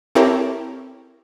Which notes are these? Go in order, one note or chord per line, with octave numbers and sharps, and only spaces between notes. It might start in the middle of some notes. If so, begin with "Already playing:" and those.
C4 E4 G4 A4 A#4 C#5